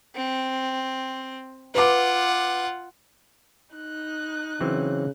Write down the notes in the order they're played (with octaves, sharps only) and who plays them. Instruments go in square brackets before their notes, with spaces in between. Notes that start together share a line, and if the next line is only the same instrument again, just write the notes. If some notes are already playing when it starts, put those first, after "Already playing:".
[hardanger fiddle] C4
[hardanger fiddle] F4 F#5 [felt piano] B4 D6
[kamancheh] D#4 F#6
[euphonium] C#3 [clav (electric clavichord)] E3 F#3 C4